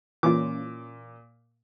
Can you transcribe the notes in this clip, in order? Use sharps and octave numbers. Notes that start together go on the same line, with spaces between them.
A#2 E3 C#4 F4 D6